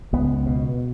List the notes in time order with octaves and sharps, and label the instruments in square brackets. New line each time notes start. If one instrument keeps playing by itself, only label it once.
[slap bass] C#2 B3
B2